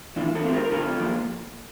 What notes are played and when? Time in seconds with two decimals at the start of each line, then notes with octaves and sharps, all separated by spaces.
0.16 E3 D4 F4
0.35 F4 A4
0.44 A3 C4
0.53 G4 A#4
0.64 A#4
0.71 D3 F4 A4
1.00 F3 A#3